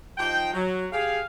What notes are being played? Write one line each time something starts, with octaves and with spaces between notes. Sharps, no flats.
F3 D#4 G5
F#3
G4 G#4 F5